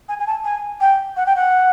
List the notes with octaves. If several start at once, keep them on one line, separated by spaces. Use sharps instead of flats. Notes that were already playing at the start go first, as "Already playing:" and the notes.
G#5
G#5
A5
G#5
G5
F#5
G5
F#5